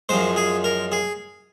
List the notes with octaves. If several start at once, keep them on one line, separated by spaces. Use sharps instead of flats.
F#2 F3 G#3 C5
G#4
A#4
G#4